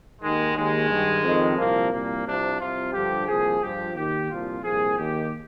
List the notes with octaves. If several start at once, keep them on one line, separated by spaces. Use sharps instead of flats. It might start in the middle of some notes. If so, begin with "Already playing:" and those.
D#2 D#3 G#3
D#2 D#3 G#3
G2 D#3
F2 D#3
C2 A#2 F3 A#3
C2 A#2 F3 A#3
C2 C3 F3 D4
C2 C3 F3 F4
G2 D3 F3 G4
C2 A#2 F3 G#4
G2 F3 G4
D#2 D#3 G4
C2 A#2 F3 F4
C2 A#2 F3 G#4
D#2 D#3 G4